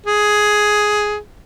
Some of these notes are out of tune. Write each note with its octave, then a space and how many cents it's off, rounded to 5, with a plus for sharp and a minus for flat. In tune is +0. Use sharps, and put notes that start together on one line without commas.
G#4 +10